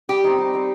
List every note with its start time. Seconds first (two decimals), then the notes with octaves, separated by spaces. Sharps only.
0.09 G3 G4
0.24 C4 D#4
0.38 G3
0.53 C4 D#4